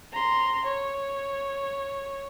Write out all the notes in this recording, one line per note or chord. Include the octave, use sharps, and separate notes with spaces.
A#5 C6
C#5